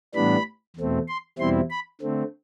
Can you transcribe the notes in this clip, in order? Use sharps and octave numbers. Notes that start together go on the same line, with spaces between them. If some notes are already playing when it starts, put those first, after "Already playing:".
A2 E3 G3 B3 D4 B5
E2 B2 A3 C4
C6
E2 B2 G3 C4 E4 C6
B5
D3 A3 C4